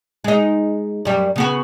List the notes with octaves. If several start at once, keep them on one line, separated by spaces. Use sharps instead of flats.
G#3 D#4
F#2 G3
C#3 B3 F#4